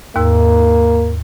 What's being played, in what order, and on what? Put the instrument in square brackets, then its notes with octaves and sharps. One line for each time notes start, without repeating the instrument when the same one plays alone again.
[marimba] D#2 G#2 E6 [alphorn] A#3